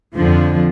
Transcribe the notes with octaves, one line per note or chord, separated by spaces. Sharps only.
F2 D3 F3